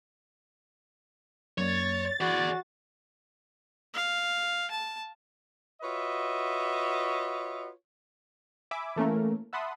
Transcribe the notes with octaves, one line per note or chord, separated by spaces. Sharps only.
F#2 A#3 C#5 D5 A6
E3 F#4 G#4 D5
F5
A5
F4 F#4 B4 C#5 D#5 E5
E5 G#5 B5 D6
E3 A3 A#3 C#4 A#4
E5 F#5 A5 B5 C6 D#6